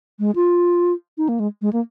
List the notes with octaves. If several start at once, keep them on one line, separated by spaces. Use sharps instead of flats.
G#3
F4
D#4
A#3
G#3
G#3
A#3